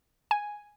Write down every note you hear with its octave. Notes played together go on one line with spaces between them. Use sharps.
G#5